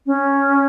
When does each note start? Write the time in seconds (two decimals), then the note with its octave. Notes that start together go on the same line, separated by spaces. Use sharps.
0.06 C#4